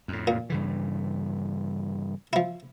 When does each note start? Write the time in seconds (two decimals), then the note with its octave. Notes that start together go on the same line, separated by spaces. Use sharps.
0.08 F2 A2
0.27 A#2
0.50 G2 C#3 E3
2.33 F3 E4